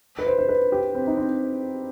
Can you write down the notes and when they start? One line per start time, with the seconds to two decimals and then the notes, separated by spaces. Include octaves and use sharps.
0.19 B4
0.26 C5
0.38 C5
0.49 B4
0.72 G4
0.95 C4
1.07 D#4
1.17 C4